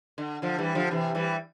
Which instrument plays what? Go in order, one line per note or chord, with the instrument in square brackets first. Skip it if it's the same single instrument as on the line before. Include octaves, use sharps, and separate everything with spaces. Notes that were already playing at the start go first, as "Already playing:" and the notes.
[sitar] D3
D3 F3
E3 G3
D3 F3
C3 E3
E3 G3